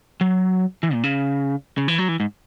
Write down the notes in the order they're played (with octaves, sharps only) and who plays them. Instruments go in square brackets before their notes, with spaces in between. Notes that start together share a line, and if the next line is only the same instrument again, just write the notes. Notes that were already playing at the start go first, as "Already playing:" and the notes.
[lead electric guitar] F#3
E3
A#2
C#3
C#3
E3
F#3
E3
G#2